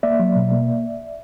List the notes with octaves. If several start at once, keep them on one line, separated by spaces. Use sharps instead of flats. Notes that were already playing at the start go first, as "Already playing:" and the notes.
A#3 D5 E5
F#3
B2
A#3